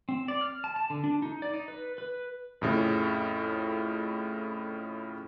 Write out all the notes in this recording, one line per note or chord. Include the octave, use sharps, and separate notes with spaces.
C4
D5
F6
A5
A5
D3
D4
D#4
D5
D#4
B4
B4
F2 A2 C#3